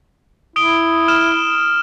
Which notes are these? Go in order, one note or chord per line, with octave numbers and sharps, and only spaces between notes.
E4 D#6 D7 G7
F6 E7